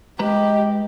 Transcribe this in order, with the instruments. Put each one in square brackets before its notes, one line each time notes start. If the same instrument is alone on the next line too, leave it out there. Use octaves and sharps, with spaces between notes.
[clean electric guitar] G#3 B4 A#5 [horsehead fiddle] G4 [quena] D#5